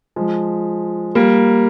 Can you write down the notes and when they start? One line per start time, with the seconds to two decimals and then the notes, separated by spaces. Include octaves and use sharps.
0.16 F3 G#3
1.15 G3 A#3